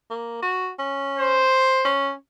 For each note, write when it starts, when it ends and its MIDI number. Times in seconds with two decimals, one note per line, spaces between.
0.11 0.38 58
0.42 0.70 66
0.79 1.43 61
1.18 1.92 72
1.84 2.12 61